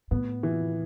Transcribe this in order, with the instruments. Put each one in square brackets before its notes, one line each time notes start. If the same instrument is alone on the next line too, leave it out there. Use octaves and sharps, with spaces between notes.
[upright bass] A2 [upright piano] B3
[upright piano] E3